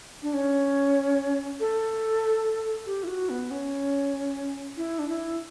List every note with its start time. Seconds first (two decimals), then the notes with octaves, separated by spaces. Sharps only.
0.22 D4
0.34 C#4
1.60 A4
2.86 G4
3.04 E4
3.07 F#4
3.29 B3
3.51 C#4
4.77 E4
4.99 D4
5.09 E4